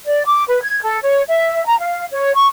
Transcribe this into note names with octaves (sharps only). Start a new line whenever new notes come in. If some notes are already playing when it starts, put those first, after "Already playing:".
D5
D6
B4
G#6
A4
C#5
E5
A#5
F5
C#5
C#6